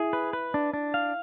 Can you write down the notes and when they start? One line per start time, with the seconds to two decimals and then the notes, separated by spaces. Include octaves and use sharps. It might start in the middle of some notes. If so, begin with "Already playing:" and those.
Already playing: E4 G#4
0.13 B4
0.33 B4
0.54 D4
0.73 D4
0.94 F5